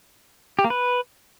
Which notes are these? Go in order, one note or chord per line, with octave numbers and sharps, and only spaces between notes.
G4
A#3
B4